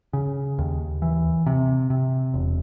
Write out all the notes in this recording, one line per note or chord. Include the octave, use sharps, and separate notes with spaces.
C#3
D#2
E3
C3
C3
E1